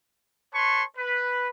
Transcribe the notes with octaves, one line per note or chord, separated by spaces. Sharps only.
B4 C#5 A5 C6 C#6
B4